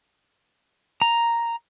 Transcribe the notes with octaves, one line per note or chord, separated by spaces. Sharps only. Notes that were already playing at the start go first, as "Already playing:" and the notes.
A#5